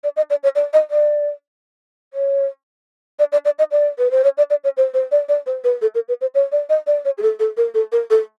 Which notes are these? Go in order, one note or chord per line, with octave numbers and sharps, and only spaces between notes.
D5
D#5
D5
C#5
D5
D#5
D5
C#5
D5
D5
D5
D#5
D5
B4
C5
C#5
D5
D5
C#5
C5
C5
D5
D5
C5
B4
A4
A#4
B4
C5
C#5
D5
D#5
D5
C#5
G#4
A4
A4
A#4
A4
A#4
A4